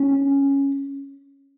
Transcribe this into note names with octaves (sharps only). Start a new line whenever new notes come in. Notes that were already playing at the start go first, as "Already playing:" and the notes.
Already playing: C#4